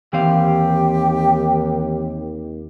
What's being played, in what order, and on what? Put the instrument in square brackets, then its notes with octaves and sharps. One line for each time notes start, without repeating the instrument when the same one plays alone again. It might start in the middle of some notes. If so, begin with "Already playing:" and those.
[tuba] D#2 [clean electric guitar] E3 C4 F5 [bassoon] G4